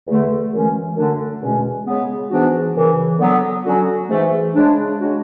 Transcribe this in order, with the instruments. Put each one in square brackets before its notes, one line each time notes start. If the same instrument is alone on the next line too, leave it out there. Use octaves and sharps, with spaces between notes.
[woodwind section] E2 D3 A3
F#2 E3 G#3 C#4
F#2 D3 A3 D4
E2 B2 G#3 C#4
C#3 G#3 B3
G#2 E3 B3 D4 F#4
F#2 C#3 E3
D3 F#3 B3
D3 F#3 C#4 F#4
G#2 E3 A3
C#3 G#3 D4
C#3 G#3 D4 F#4